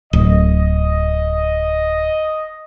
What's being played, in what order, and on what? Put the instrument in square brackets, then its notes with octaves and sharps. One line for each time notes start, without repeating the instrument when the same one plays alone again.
[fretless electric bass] D1 [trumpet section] D#5